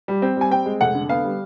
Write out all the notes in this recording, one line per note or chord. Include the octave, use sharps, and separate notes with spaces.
G3
C4
G3 G#5
C4 G5
G#3
F1 F#5
D3
B3 F5
G3